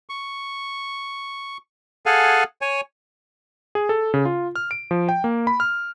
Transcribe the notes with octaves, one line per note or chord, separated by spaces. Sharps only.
C#6
G#4 A4 F5 F#5 G#5
C#5 G#5
G#4
A4
C#3
F4
F6
D7
F3
G5
A#3
B5
F6